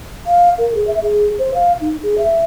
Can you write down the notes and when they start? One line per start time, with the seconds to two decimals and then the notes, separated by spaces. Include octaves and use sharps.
0.27 F5
0.58 A#4
0.75 G#4
0.87 E5
1.02 G#4
1.39 C5
1.55 F5
1.81 D#4
2.03 G#4
2.18 E5